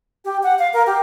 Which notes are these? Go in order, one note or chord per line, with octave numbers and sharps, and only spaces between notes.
G4
F#5
F5
A#4
G4